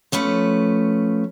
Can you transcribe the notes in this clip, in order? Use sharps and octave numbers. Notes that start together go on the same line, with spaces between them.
F3 A3 C#4 B4